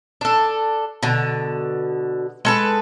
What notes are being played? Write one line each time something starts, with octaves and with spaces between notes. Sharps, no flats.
D4 A4
B2 D3
G#3 A4 B4